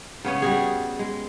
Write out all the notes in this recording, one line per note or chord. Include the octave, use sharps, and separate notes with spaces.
C#3 B3 C#4
G3 F#4 G#4
G#3